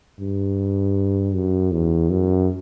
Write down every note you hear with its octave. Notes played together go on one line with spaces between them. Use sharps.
G2
F#2
E2
F#2